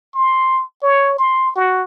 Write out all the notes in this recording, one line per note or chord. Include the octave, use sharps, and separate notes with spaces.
C6
C#5
C6
F#4